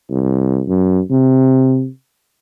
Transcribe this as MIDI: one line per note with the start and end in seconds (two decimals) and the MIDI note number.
0.11 0.62 36
0.68 1.00 42
1.10 1.88 48